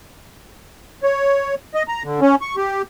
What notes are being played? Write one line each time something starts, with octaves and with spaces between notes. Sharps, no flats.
C#5
D#5
A#5
D3
C#4
C#6
G4